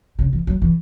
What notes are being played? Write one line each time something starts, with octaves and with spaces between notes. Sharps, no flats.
C#3
E3
F#3
E3